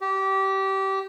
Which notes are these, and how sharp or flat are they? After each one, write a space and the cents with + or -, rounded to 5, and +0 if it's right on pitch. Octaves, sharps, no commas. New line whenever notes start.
G4 -20